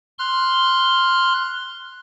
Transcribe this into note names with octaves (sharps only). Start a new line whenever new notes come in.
C6 F6 F#6